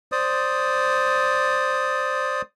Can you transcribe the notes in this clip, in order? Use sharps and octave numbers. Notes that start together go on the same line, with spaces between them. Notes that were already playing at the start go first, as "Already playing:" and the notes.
C5 D5 D#6